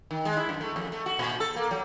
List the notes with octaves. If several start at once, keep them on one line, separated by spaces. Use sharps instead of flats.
D#3
G#3
E4
F#2
A3
F2
A3
F#4
A#2
A4
A#3
F#3